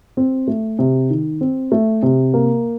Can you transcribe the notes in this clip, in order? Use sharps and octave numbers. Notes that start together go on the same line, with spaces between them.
C4
A3
C3
D#3
C4
A3
C3
A#3